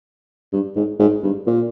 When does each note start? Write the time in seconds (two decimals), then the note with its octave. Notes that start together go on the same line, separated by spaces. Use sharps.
0.53 G2
0.76 G#2
1.00 G#2
1.23 G2
1.47 A#2